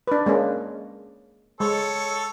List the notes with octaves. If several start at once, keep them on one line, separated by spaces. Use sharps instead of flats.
D4 B4
G#3 A#3 C#4
G#3 A4 C#5